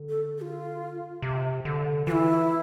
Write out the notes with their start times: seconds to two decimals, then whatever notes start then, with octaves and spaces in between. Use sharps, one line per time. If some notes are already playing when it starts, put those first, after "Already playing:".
Already playing: D3
0.09 A4
0.38 A4
0.41 F4
1.22 C3
1.65 D3
2.07 E3 E4 F4